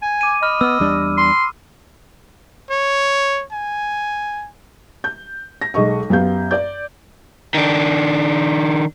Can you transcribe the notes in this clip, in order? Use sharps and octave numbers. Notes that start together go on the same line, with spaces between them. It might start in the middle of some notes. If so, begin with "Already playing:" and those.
G#5
D6 D#7
D#5 B5 F6
B3 E6 F6
E2 G3 D4
C6
C#5
G#5
G6
A#6
B1 G#3 D#5 C#6
F#2 B3 G4 F5 G6
D5 G6
D#3 D4